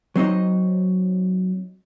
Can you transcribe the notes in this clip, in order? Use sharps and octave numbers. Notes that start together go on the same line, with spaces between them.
F#3 C4 D#4 D#5